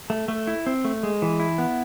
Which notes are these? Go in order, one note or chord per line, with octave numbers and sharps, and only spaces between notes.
A3
A3
E4
C4
A3
G#3
E3
E4
B3